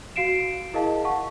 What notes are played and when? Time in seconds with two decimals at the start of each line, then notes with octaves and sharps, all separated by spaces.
0.16 F#4 F5 C7 D7 E7
0.74 E4 G#4 A#4 D#5 F5 A5
1.04 F5 F#5 A5 C#6